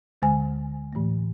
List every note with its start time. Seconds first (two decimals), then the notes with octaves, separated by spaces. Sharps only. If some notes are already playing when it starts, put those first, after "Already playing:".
0.22 D2 D3 G#3 G#5
0.93 A2 E3 A3